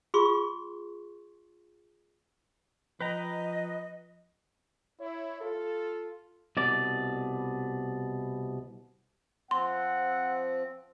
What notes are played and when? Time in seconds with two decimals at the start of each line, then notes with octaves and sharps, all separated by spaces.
0.14 F4 G#4 C6 C#6
3.01 F3 B4 D#5 G5 A#5
5.01 E4 C#5
5.41 F4 A4
6.57 C2 B2 D5
9.51 F3 C4 F#5 C6